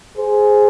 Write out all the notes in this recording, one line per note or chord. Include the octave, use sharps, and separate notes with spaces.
G#4 C5